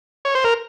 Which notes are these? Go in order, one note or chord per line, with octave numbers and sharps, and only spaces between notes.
C#5
C5
A#4